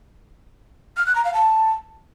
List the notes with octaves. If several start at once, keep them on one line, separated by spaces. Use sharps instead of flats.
F6
F#6
A#5
F5
A5